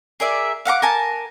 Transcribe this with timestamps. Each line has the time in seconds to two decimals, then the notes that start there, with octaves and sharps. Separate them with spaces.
0.20 G#4 A#4 D5 E5
0.65 F5 F#5 A#5 D6
0.82 A#4 G#5 A5